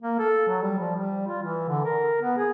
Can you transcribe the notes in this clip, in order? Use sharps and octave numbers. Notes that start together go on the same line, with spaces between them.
A#3
A4
F#3
G3
F3
G3
F4
E3
D3
A#4
B3
G#4